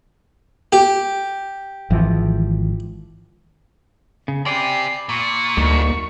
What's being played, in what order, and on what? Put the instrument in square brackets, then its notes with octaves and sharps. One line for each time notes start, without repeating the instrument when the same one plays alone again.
[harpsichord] G4
[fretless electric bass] G#1 E3 F3
[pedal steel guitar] C#3
[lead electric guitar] C4 G4 [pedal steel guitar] D5 G#5 B5 [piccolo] C7
[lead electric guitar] A#2 [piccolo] C#6
[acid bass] D2 [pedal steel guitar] G3 A#3 D#4